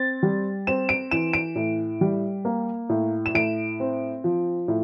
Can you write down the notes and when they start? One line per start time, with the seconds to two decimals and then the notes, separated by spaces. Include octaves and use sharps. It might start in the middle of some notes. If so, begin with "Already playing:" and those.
Already playing: C4 A6
0.23 G3
0.67 C4 E7
0.89 D7
1.11 E3 E7
1.33 D7
1.56 A2
2.01 G3
2.45 A#3
2.89 A2
3.26 E7
3.34 A2 D7
3.80 C4
4.24 F3
4.68 A2